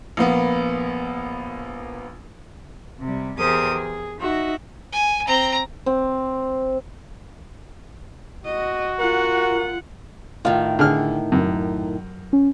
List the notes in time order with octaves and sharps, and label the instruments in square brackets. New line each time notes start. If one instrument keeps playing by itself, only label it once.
[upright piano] A#1 A#3 B3
[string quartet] C3 G3
E2 G4 G#4 A#4 C5 D#6
G#4
D#4 F#4 E5
[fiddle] G#5
C4 A#5
[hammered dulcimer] C4
[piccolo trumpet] F#4 [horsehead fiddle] D#5
[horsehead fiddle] F4 F#5 [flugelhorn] A#4
[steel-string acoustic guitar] A2 D#3 [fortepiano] F4
[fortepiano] D3 G#4 F6
F#2
[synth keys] C#4